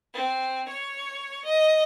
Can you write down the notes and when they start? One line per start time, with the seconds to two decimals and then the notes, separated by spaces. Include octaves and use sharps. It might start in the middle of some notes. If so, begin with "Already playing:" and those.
0.13 C4
0.68 C#5
1.45 D#5